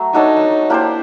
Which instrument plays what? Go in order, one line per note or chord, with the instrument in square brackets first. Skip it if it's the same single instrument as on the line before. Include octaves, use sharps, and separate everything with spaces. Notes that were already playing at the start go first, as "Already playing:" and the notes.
Already playing: [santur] F#3 A3
[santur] D4 F#4 A4 C#5 [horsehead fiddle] D#4
[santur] A#3 D4 G4 C5 [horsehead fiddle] E4